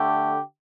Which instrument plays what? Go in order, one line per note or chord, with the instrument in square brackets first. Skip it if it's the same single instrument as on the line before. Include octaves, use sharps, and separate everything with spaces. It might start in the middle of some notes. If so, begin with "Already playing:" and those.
Already playing: [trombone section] D3 A3 G4